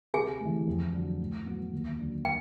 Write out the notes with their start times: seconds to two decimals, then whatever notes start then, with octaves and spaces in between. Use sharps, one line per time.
0.14 C3 G#4 G#5
0.40 E3 A3
0.67 F2
0.93 D3 F#3
1.20 A2
1.46 F#3 B3
1.73 D#2
1.98 D3 F#3
2.25 G5